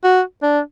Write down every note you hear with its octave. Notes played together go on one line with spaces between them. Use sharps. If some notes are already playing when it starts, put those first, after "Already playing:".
F#4
D4